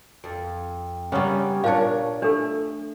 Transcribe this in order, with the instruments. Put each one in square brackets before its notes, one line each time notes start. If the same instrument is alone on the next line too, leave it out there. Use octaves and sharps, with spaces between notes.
[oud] F2
[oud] C#3 G3 [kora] A#3 B3 C#4
[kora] A#2 D4 [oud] A#4 C#5 [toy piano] F5 A5
[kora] A3 [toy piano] D4 A4